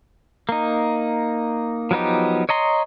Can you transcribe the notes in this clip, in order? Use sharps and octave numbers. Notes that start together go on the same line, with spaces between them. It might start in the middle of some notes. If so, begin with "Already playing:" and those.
A#3 D#4
F3 F#3 B3 D#4 G4
C#5 D#5 A#5 C6